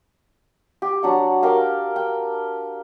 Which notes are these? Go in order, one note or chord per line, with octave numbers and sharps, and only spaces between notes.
G4
F#3 D4 F#5
G4 A#4 F5 G5
G5